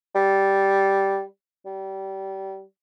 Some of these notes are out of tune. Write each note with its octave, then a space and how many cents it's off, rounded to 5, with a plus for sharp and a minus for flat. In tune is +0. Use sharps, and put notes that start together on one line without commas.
G3 -5
G3 -25